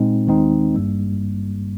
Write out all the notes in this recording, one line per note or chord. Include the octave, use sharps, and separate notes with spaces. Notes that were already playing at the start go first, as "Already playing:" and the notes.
Already playing: A#2 G#3 C4 D#4
D#2 D#3 G#3 C4 D#4
G#1 G2 G3 A#3